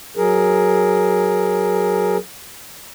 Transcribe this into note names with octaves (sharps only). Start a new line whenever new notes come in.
F#3 G#4 A#4